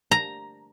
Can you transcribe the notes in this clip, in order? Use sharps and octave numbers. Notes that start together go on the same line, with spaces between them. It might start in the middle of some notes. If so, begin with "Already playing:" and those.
A#5